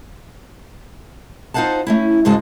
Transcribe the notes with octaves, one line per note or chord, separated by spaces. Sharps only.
D#4 F4 C5 F5 F#5 A5
A3 C#4 E4
G#2 C#3 G#3 F#4 A5